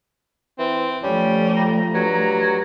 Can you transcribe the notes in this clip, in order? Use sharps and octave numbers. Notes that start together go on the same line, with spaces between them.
E3 C4
F3 G3 A3 C#4
A#5
G2 F#3